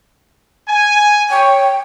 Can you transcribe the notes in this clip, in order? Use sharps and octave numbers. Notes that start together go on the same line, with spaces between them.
G#5
C#5 G5